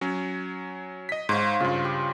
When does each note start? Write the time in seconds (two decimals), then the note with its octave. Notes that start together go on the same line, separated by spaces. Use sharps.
0.01 F#3 C#4
1.09 D#5 B6
1.29 G#2 C5 C#5 F5
1.60 G2 C#3 F4
1.85 G4